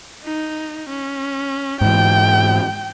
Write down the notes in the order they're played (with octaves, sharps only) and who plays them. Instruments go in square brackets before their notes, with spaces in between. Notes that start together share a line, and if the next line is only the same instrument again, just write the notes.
[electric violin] D#4
C#4
[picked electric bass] G#2 E3 [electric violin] G5